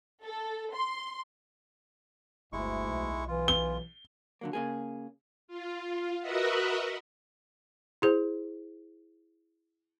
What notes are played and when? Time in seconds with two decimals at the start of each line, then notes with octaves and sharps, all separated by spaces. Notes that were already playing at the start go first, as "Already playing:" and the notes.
0.24 A4
0.74 C6
2.53 G1 D2 G#3 E4 C#6
2.89 B1
3.28 E3 F4
3.48 G7
4.41 D3 F#3 A#3
4.53 C#3 A#3 G#4
5.48 F4
6.21 F#4 A#4 B4 D#5 E5 F#5
8.02 E4 G#4 C5